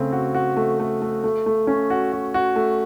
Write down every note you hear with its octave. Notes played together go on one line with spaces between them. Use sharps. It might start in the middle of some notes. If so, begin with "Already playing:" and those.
Already playing: C#3 A3 C4
F#4
F#4
A3
A3
A3
A3
A3
C#4
F#4
F#4
F#4
A3